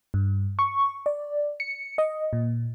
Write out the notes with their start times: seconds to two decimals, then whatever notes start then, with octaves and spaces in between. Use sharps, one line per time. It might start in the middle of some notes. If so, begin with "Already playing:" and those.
0.14 G2
0.59 C#6
1.06 D5
1.60 C#7
1.98 D#5
2.33 A#2